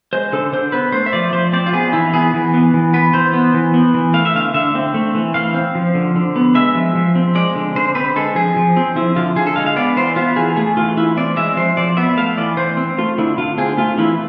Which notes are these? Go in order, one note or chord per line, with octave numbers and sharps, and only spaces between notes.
G#3 C5
D3 A4
D3 C5
B3 B4
A3 C5
E5
F3 D5
F3 C5
C4 D5
F4
B3 G#4
E3 E4
B3 G#4
E3
B3
E3
B3 B4
E3 C5
B3
E3
B3
E3
A3 F5
E5
D3 F5
D3 E5
C4
A3
E3
E3 F5
C4
F3
D3
D3
B3
G#3 E5
F3
F3
C4
G#3 D5
D3
D3 C5
C4 B4
G#3 A4
F3 G#4
F3
C4
F3 E4
D3 F4
D3 G#4
A4
G#3 F5
F5
B3 D5
E3 C5
B3 F4
E3 G#4
A3 G#4
E3 F4
E3 E4
C4 D5
G#3 E5
F3 C5
F3 D5
B3 E5
A3 F5
E3 D5
E3 C5
C4
A3 F4
D3 E4
D3 F4
C4 G#4
A3 F4
E3 E4